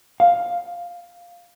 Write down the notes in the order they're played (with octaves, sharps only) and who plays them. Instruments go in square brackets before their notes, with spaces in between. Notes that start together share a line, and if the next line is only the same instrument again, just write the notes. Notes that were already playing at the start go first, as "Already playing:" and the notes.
[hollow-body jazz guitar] F5